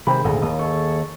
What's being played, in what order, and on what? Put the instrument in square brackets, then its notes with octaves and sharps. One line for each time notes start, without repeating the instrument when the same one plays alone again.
[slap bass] C3 D#3 [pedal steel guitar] G#3 C5 B5
[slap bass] G#1 D2 A#2 [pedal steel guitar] G#4 A4 D#5
[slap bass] D#2 [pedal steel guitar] D#6
[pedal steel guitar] G#4 A4 C#6